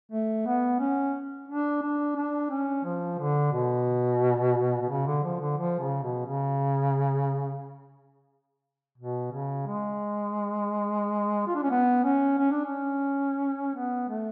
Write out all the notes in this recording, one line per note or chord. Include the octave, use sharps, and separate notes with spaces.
A3
B3
C#4
D4
D4
D4
C#4
F3
D3
B2
B2
C#3
D3
F3
D3
F3
C#3
B2
C#3
B2
C#3
G#3
F4
D4
C#4
B3
C#4
C#4
D4
C#4
B3
A3